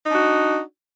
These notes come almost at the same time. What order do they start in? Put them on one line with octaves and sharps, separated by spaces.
D#4 D4 F#4